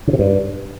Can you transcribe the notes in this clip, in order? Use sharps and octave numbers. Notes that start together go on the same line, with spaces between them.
C#3
C3
G2